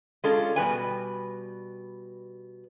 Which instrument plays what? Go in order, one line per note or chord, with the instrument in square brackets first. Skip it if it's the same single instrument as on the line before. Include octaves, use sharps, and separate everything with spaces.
[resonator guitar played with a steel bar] G#3 C#4 D4 F4 A4
B2 G3 B4 G#5